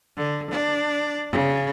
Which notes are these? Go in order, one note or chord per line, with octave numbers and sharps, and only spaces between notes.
D3
D4
C#3